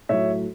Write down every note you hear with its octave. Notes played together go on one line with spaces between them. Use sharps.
A2 F#3 C#5 E5